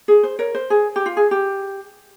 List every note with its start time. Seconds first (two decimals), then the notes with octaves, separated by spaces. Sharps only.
0.08 G#4
0.23 C5
0.39 A#4 C#5
0.55 C5
0.70 G#4
0.96 G4
1.06 F4
1.17 G#4
1.31 G4